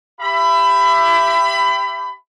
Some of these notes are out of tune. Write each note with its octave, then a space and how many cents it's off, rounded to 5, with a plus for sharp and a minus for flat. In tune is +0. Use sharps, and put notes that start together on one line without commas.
G4 +0 E5 +25 B5 +25